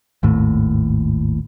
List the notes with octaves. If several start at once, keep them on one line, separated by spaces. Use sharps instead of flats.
G#1 D#2 A2